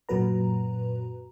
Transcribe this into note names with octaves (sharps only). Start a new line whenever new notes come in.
F#2 A#2 F#3 F#4 B4 A#5